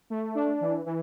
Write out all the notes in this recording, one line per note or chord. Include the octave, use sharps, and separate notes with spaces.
A3
D4
E3
E3